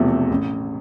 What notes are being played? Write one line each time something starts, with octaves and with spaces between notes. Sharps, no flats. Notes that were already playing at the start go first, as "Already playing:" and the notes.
Already playing: E1 E2 C3 F3 A3
A1